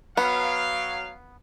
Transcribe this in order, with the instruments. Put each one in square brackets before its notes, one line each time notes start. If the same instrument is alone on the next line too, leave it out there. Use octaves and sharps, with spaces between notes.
[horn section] F#3 F5 [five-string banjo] B3